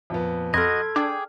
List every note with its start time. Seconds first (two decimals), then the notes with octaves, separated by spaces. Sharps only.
0.10 F2 A#2 B3
0.54 F2 F#4 A4 D#5 B5 C6 F6 G#6
0.96 D4 G#4 G5 D6